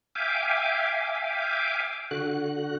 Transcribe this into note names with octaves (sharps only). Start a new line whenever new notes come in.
E5 F5 G5 G#5 D6
D3 F#4 F#6